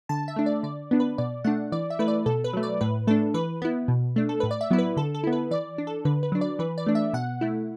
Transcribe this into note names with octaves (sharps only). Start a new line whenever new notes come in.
D3 A5
E5
A3 D4
D5
D3 D5
B3 D4
B4
B2 D5
A3 D4 F#5
E3 D5
E5
A3 E4 B4
D5
B2 A4
B4
F#3 A3
D5
A2 B4
A3 D4 A4
E3 B4
B3 E4
B2
A3 D4
A4
A2 B4
D5
E5
F#3 B3 E4
B4
D3 A4
A4
B3 E4
B4
E3 D5
D4
A4
D3 B4
B4
F#3 D4
D5
E3 B4
D5
A3 D4
E5
B2 F#5
A3 E4